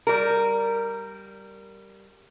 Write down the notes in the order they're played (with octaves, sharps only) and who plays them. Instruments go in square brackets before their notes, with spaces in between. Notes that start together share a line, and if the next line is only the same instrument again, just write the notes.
[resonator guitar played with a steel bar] G3 A#4